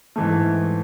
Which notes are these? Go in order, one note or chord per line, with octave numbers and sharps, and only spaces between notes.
G#2 E3 A3